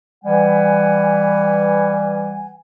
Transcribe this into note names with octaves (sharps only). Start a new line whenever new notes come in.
E3 G3 B4 F#5 G#5